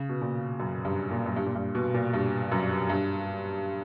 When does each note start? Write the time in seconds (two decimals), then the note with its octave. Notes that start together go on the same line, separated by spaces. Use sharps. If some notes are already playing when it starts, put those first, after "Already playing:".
Already playing: C#3
0.09 B2
0.21 A#2
0.60 F#2
0.85 G2
1.11 A#2
1.26 F#2
1.36 G2
1.46 A#2
1.55 G2
1.75 B2
1.94 A#2
2.14 G2
2.52 F#2
2.90 G2